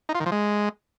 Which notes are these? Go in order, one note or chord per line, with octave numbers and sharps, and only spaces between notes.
D#4
F4
D#3
F3
G#3